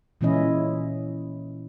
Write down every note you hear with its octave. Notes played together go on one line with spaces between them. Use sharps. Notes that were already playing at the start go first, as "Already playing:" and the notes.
A#2 E3 G#3 C#4 E4 D#5